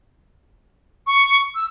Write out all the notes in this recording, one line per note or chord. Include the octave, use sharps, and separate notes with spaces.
C#6
E6